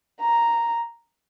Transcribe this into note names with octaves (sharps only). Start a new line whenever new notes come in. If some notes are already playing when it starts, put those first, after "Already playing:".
A#5